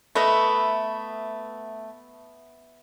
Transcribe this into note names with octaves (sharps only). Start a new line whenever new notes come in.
A3 B3 B4 D#5 E5